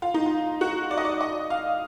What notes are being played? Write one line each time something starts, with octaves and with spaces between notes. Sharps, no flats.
F4
D#4
F4
F#4
D5
D#5
D5
D#5
F5